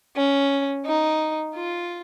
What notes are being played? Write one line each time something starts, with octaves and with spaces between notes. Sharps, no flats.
C#4
D#4
F4